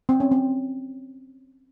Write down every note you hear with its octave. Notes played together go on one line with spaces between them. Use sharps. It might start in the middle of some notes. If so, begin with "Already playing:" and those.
C4
C#4
C4